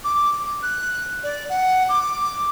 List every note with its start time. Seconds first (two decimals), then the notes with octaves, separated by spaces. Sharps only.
0.04 D6
0.63 F#6
1.23 D5
1.49 F#5
1.89 D6